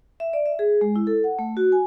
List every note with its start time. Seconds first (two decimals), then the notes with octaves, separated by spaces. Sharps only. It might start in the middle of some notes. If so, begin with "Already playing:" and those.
0.20 E5
0.33 D5
0.46 E5
0.59 G#4
0.81 G#3
0.96 E4
1.07 A4
1.24 F#5
1.39 A3
1.57 F#4
1.72 G#5